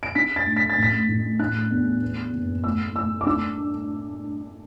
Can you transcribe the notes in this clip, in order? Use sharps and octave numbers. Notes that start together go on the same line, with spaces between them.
D7
D4 B6
A6
A2
B6
A6
A1
B6
A1
D4 F#6
E2
B3
F#1
A2 E6
A2 E6
D6
D4 E6